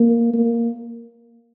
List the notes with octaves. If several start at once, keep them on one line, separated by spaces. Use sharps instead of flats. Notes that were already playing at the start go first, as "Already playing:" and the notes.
Already playing: A#3
A#3